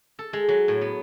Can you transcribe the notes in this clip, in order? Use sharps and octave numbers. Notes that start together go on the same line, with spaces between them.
A4
G#3
F#3
A2
B3